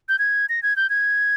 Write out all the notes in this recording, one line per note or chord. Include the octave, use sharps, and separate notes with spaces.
G6
G#6
A#6
G#6
G6
G#6